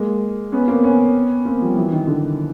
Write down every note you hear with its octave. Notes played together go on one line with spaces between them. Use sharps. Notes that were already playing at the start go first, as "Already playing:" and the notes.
Already playing: G#3 A#3
B3 C#4
A#3 C4
B3 C#4
A#3 C4
F3 G3
E3 F#3
D#3
D3